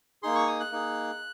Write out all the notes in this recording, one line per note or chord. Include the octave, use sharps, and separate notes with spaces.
A#3 D#4 G#4 C6
C#6
D#6
F#6
A#3 D#4 G#4